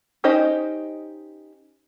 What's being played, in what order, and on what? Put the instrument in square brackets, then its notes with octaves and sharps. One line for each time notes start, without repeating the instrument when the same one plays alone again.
[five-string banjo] C#4 D#4 G4 C5 D#5